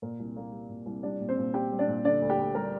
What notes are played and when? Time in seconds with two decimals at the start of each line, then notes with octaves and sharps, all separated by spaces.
0.02 A#2 A#4
0.19 C2
0.37 A#3
0.52 G3
0.70 A#2
0.86 C2
1.03 G3 D4 D5
1.20 A#2
1.29 C4 C5
1.37 A#2
1.54 C4 G4 G5
1.71 G3
1.79 D4 D5
1.88 A#2
2.04 D3 D4 D5
2.22 D2
2.30 G4 G5
2.39 D2
2.55 G3 A#4 A#5